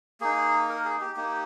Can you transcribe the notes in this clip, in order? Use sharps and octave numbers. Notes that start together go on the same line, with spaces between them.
A#3 D#4 G#4
A#4
G#4
G4
A#3 D#4 G4